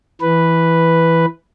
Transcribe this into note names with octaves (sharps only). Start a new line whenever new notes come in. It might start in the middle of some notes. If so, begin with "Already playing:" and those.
E3 B4